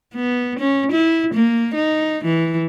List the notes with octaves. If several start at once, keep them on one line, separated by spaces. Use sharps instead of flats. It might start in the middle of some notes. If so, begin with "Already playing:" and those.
B3
C#4
E4
A#3
D#4
E3